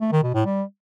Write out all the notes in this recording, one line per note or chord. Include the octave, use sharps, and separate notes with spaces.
A3
D#3
B2
A2
G3